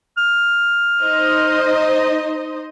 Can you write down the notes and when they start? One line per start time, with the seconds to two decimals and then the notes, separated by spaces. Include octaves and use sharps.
0.17 F6
1.02 D#4 C5 D#5